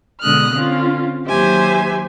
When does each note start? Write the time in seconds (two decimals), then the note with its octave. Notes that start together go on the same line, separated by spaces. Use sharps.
0.20 B2 D3 G#3 D#6 F6 F#6
0.52 D3 C4 C#4 F4
1.27 D#2 F#3 G4 C5 E5 G#5